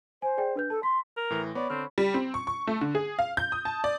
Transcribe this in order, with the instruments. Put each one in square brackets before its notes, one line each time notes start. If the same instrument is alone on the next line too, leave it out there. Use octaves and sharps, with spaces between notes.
[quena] C5 [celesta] G#5
[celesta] G#4 D5 G5
D4 B4 G6
[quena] A4 [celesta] A5
[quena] C6 [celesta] B6
[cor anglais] A#4
[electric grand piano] A2 E3 [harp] C6 A#6
[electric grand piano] B3 [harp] C#5 B5 [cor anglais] D5
[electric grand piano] D3 D4 F6 [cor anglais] C4
[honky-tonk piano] G3
C4
C#6
C#6
A3
D3
G#4
F5
G6
D#6
A5
D5